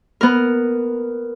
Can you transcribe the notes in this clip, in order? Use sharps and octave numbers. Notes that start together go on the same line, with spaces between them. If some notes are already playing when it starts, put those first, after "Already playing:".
B3 A#4